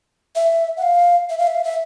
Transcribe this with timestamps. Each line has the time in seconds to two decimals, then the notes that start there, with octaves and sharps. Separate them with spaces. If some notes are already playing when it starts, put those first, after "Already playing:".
0.35 E5
0.77 F#5
0.82 F5
1.30 E5
1.38 F5
1.47 E5
1.55 F5
1.64 E5